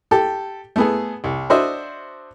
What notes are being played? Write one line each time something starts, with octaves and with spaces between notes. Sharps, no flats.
G4 A4
A3 B3 G#4
C2
D4 F#4 C5 D#5 E5